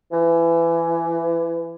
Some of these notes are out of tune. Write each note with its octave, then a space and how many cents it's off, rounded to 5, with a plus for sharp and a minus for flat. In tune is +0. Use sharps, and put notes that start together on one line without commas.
E3 +25